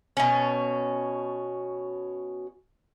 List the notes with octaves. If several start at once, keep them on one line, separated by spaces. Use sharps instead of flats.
B2 C#4